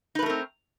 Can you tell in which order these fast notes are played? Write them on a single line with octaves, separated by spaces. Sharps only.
D#4 B4 A3 A#4 C4